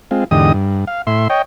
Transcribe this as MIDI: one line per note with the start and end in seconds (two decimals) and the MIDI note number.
0.11 0.24 56
0.11 0.24 60
0.11 0.24 65
0.31 0.52 40
0.31 0.52 44
0.31 0.52 50
0.31 0.52 67
0.31 0.52 75
0.31 0.52 87
0.54 0.85 43
0.87 1.02 77
1.07 1.28 45
1.07 1.28 76
1.07 1.28 84
1.30 1.42 73
1.30 1.42 75
1.30 1.42 79